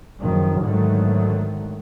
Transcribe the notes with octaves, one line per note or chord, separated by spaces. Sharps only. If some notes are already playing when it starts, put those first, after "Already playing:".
F#1 D#3 F3
G#2 D3 D#3 F#3 A3